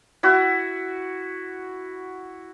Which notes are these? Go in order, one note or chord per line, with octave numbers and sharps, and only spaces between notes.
E4 F#4